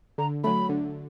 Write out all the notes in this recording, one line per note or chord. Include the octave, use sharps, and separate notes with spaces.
D3 A#5
F#3 A3 B5
D3